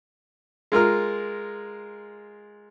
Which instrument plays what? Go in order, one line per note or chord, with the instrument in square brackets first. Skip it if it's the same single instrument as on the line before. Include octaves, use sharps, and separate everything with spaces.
[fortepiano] G#3 F4 A#4 F6